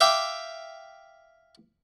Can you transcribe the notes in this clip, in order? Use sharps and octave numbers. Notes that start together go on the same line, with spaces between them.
E5 F5 G5 D6